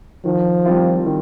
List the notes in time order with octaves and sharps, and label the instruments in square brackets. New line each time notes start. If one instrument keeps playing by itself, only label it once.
[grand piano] D#3 [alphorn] F3
[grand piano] G3 C4 F4
D#3